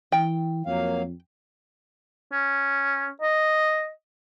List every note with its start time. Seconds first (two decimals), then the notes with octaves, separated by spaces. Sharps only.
0.12 E3 G5
0.66 F2 F#3 A#3 F5
2.32 C#4
3.22 D#5